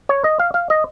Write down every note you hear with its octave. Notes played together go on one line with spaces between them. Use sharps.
C#5
D#5
F5
F5
D#5